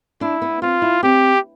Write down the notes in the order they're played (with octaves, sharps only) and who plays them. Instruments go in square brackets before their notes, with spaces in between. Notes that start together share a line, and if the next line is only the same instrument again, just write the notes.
[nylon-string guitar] D4 [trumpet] E4
[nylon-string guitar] B3
[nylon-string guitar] C4 [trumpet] F4
[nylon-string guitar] E4
[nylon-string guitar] C4 [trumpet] G4